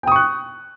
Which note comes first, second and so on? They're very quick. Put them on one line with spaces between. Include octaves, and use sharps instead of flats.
G5 D#6 C#6 F#6